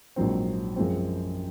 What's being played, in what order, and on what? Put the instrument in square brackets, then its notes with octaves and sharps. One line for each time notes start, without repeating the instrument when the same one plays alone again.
[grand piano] A#1 G#2 F#3 C4
F#2 F3 G#3 C4